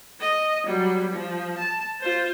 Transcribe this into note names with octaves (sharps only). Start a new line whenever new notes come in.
D#5
F#3 G3
F3
A5
F4 C5